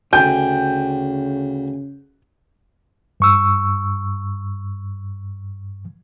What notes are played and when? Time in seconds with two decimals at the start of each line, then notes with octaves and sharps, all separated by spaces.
0.13 D2 C#3 G5 G#5 G6
3.20 G2 C#6 E6